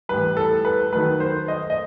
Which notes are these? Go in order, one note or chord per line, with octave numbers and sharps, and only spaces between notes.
A2 E3 G3 B4
A4
B4
D#3 F#3 A3 B4
C5
D#5
D#5